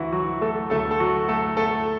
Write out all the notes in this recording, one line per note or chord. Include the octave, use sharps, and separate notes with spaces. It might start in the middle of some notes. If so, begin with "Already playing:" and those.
Already playing: D2 D3 E3 F#3 E4 F#4
F#3 F#4
A3 A4
D2 D3 F#3 A3 A4
A4
F#3 F#4
A3 A4
A3 A4